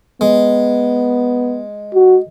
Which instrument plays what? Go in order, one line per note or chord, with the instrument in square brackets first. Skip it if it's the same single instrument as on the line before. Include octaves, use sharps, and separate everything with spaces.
[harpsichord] G#3 [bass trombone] B3
[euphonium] F#4